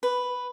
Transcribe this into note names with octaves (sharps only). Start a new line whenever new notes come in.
B4